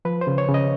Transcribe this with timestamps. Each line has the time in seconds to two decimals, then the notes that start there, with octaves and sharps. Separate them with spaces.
0.05 F3 B4
0.21 C5
0.27 C#3
0.38 C#5
0.49 C#3
0.54 D#5